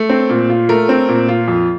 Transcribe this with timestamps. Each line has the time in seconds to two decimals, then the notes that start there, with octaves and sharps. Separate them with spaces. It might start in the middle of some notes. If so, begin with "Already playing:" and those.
Already playing: A3
0.10 C4
0.30 A#2
0.50 F4
0.69 A3 A#4
0.89 C4
1.08 A#2
1.28 F4
1.48 F2